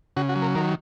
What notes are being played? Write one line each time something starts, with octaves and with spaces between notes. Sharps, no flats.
C#3 F#4
F#4
F#3
A#4
D#3 A#4